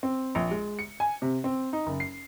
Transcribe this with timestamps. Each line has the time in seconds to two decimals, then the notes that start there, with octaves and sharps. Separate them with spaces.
0.03 C4
0.35 A#1
0.51 G#3
0.79 C#7
1.00 G#5
1.22 C3
1.44 C4
1.73 D#4
1.87 F#1
2.00 C7